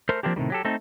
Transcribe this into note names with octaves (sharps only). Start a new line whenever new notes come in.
A3 A#4 C5
F3 G#3 A#3 C4 D4 G4
A2 C3 D#3 G3
F#3 G4 A4
A3 C4 D#4 A4